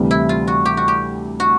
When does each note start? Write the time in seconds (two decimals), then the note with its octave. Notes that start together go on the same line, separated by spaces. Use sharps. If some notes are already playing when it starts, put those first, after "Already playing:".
Already playing: D2 C3 E3 G3
0.11 E4
0.29 F4
0.47 F#4
0.66 G4
0.77 F#4
0.88 G4
1.40 F#4